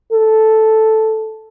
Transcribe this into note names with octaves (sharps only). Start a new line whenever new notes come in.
A4